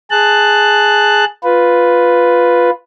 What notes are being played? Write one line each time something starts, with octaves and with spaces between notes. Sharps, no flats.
G#4 A5 F#6
F4 B4